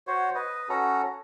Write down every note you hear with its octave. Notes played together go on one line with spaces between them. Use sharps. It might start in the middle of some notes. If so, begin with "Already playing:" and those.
F#4 C5 C#5
B4 D#5
C#4 F#4 A4 A#5